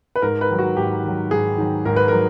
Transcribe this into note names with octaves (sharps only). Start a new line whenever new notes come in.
B4
G#2 A#4
B4
D#3 F#3
F#4
G#2 G4
D#3 F#3
G#2 G#4
D#3 F#3
G#2 A#4
B4
F#3 A#4